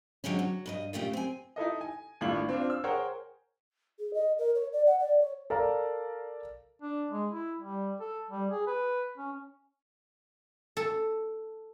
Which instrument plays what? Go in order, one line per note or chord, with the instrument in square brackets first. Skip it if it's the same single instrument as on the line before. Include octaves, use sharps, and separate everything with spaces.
[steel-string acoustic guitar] D3 F#3 G#3 C4 C#4
F#3
G2 A#4 D#5
A#2 C#3 F3 A3 G4
C4 G#5
[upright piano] D#4 E4 A4 D#5
G#5
G#1 A2 D4 F4 F#7
C4 D4 F4
E6
G#4 A#4 C5 C#5 F#5 G5
[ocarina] G#4
D#5
A#4
C#5
D5
F#5
D5
C#5
[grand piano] A4 A#4 D5 F5 A#5
[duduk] D4
G#3
E4
G3
A4
G3
G#4
B4
C#4
[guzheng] A4